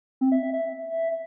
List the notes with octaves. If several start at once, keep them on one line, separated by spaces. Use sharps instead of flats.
C4
E5
E5
E5